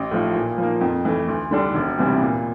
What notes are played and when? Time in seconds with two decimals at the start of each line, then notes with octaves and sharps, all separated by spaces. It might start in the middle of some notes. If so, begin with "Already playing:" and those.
Already playing: A1
0.11 A2 F3
0.35 A#2
0.58 F3 A#3
0.81 F2
1.05 E3 A3
1.28 D2
1.51 D3 G3 D4 A4
1.74 E1
1.97 D2 C3 E3 G3
2.21 A#2